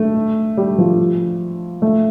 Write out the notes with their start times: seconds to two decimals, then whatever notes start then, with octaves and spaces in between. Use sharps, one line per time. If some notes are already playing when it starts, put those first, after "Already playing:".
Already playing: A3
0.57 G3
0.78 F3
1.82 A3